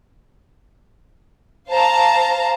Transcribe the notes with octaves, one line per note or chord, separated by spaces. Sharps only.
C5 F5 A5 A#5